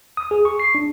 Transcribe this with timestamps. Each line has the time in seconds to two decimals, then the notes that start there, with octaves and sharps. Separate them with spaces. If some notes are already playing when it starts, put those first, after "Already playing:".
0.17 D#6
0.31 G#4
0.45 C#6
0.60 C7
0.75 D4